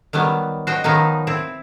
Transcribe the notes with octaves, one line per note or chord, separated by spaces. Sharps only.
D#3 F#3 G3 B3
F#4 C5 D#5 G5
D#3 F3 F#3 B3 D#4
C4 E4